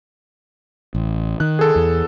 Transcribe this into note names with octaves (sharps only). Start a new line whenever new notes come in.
A1
D#3 F#6
G#4 A4
E2